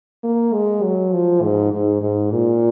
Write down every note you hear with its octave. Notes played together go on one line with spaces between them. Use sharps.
A#3
G#3
F#3
F3
G#2
G#2
G#2
A#2